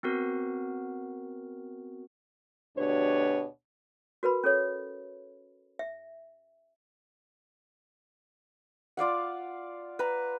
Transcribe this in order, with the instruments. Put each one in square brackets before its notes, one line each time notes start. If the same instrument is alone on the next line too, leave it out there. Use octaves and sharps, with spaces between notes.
[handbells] B3 C4 F#4 A#4
[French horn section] D2 B2 D4 G4 B4 C#5
[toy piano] F#4 A#4 B4 B5
C#4 A4 C#5
E5
[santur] F4 D5 F5 F#5
B4 A#5